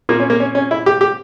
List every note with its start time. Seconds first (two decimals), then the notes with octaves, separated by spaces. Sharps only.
0.09 A#2 A#3
0.20 C#4
0.30 A#3
0.40 C#4
0.55 C#4
0.71 E4
0.86 G4
1.01 G4